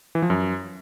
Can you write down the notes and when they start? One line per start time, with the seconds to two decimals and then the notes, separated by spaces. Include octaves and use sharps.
0.15 E3
0.22 F3
0.30 F#2